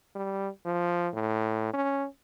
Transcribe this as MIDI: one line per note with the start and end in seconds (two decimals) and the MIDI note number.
0.15 0.49 55
0.65 1.08 53
1.14 1.70 45
1.73 2.06 61